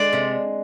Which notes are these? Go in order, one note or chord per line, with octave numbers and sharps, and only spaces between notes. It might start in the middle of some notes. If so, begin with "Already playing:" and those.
Already playing: G#3 D4 D5
C3